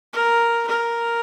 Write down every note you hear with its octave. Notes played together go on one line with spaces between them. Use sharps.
A#4
A#4